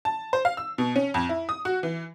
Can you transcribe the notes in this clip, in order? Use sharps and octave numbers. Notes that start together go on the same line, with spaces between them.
A5
C5
F5
E6
B2
C#4
F2
E4
D#6
F#4
E3